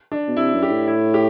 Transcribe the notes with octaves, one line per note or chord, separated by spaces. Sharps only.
D4
B2
C3 E4
F#2
G4
A2
E4
G4